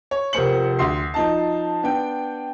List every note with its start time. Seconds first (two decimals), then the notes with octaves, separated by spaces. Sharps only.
0.11 C#5
0.33 F1 F2 A#4 C5 C#7 F#7
0.79 D2 C6 C7
1.14 F3 D#4 A5
1.83 B3 D4 G5